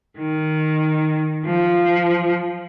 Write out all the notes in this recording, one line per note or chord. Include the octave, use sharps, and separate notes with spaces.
D#3
F3